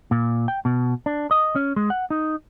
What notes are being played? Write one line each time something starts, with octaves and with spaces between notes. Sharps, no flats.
A#2
G5
B2
D4
D#5
C#4
G#3
F#5
D#4